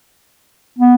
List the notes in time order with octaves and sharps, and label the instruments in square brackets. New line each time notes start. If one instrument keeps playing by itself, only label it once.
[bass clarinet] B3